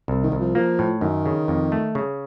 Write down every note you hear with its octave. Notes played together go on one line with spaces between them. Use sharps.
C2
D#3
C2
F3
F3 A#3
A2
F#2 D#3
C#3
F2
A3
C#3